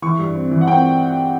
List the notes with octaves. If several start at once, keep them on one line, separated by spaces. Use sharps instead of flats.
E3 C#6
G2
C4
E3
F#5
C4 G5